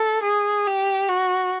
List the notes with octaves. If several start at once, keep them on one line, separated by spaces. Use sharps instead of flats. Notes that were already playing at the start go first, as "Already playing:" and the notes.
Already playing: A4
G#4
G4
F#4